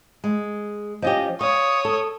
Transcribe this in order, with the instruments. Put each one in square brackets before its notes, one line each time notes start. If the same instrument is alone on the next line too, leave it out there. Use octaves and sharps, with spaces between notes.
[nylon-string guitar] G#3
[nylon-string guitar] F3 C#4 G4 [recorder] D#5
[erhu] C#5 [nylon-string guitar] F5 [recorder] D#6
[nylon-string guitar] A4